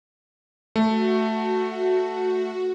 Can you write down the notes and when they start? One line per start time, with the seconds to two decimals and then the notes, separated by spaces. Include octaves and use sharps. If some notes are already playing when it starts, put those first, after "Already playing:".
0.76 A3 F#4